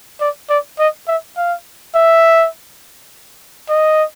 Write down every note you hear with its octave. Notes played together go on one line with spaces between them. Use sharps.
D5
D5
D#5
E5
F5
E5
D#5